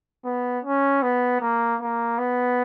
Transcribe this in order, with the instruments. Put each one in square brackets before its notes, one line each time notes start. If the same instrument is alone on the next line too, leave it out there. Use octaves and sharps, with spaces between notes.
[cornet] B3
C#4
B3
A#3
A#3
B3